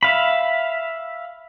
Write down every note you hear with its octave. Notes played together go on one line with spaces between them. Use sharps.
E5 F5 B5